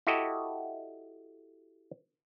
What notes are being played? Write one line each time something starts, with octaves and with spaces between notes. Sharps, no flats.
E4 F#4 G4 A4 D#5